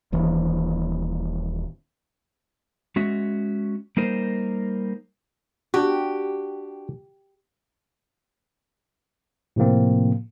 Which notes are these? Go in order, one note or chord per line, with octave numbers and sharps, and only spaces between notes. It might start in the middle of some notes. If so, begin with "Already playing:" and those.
D#1 D#2 E3
G#3 C#4 F#4 E5
G3 A#3 D#4 A#4 C5
D4 F#4 G4
A2 C3 F3 A#3 C4